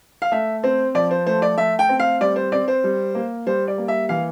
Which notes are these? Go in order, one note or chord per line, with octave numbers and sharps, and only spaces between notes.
F5
A3 E5
C4 C5
F3 D5
C5
A3 C5
D5
A3 E5
G5
C4
F5
G3 D5
C5
C4 D5
C5
G3
A#3
G3 C5
D5
A#3
E5
E3 F5